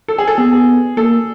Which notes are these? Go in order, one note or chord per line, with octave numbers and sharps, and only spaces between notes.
A4
G#4
A4
B3 G#4
G#4
A#3 A4